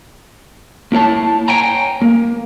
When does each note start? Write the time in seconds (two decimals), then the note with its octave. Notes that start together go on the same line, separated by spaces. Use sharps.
0.92 A#3 E4 C#5 A5
1.48 C#5 E5 G5 G#5 A#5
2.02 A#3